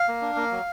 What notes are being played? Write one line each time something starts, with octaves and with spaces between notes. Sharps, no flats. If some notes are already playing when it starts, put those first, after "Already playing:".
Already playing: F5
A#3
D4
A#3
F#3